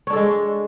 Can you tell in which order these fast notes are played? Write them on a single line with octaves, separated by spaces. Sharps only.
C#5 D4 A4 G#3